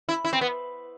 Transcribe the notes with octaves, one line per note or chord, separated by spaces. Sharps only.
E4
E4
C4
B3